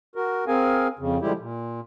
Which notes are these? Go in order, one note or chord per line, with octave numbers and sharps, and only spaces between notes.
F#4 A#4
C4 G#4 A#4 F5 G#5
F2 C#3
D3 F3 G3 G#3 E4 G4
A#2